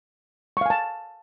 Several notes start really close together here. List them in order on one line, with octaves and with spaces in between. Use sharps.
C#6 F5 G#5 A5